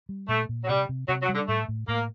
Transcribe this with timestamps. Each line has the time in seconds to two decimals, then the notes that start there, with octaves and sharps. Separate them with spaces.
0.09 G3
0.28 A#2 A3
0.49 A#2
0.64 F#3
0.69 C3 G3
0.89 C3
1.08 C3 F#3
1.22 F#3
1.29 G3
1.35 D3
1.48 A2 A3
1.68 A2
1.88 A2 A#3